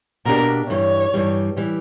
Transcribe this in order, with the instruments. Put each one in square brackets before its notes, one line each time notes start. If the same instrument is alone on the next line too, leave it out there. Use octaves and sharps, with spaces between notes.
[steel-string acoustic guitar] B2 A#3 D4 G4 [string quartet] A#4
[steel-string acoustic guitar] G2 E3 G3 [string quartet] C#5
[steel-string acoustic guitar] G2 E3 G3
E3 G3